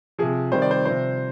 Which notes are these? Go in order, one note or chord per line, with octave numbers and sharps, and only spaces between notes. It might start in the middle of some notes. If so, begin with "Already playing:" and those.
C3 F3 G#4
C3 D#3 G3 C5
D5
C5
C3 F3 C5